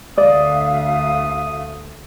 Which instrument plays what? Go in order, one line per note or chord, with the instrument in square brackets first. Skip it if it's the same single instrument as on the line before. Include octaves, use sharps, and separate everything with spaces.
[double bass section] D2 A3 [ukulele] D5 [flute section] E5 F5 [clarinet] D#6